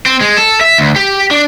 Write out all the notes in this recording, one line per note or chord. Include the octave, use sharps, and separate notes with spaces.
C4
G#3
A4
E5
D2
G4
D4